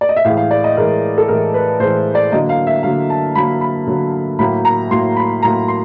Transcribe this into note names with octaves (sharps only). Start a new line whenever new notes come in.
D5
D#5
E5
A2 E3 G#3 F5
F5
D5
D#5
A2 E3 G#3 A#4
A4
A2 E3 G#3 A#4
B4
A2 E3 G#3 C5
D5
D3 F#3 A#3 D#5
F5
E5
D3 F#3 A#3 F5
A5
D3 F#3 A#3 B5
B5
D3 F#3 A#3
A2 F#3 A#3 B5
A#5
A2 F#3 A#3 C6
B5
A2 F#3 A#3 A#5
C6